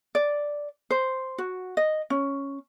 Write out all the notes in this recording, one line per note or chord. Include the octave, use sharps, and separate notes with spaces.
D5
C5
F#4
D#5
C#4